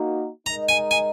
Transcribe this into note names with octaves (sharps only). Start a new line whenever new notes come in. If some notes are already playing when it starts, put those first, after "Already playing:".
Already playing: A#3 D#4 F#4
G#3 D#4 A#4 D#5 A#5
G#5
G#5